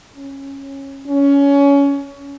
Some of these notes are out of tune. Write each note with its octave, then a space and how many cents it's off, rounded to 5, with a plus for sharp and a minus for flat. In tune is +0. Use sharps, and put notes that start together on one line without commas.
C#4 -15
C#4 +20